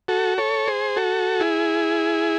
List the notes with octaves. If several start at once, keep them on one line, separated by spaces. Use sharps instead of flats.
F#4 A4
A4 C#5
G#4 C5
F#4 A4
E4 G#4